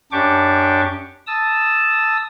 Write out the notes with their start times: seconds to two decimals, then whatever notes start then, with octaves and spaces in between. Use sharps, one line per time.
0.12 F#2 D4 G4 C#6 D6
1.27 A5 D#6 E6